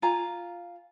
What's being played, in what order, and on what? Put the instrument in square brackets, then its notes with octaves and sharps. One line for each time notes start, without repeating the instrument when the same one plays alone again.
[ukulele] F4 F5 G#5 A#5